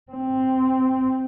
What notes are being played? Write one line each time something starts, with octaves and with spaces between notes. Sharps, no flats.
C4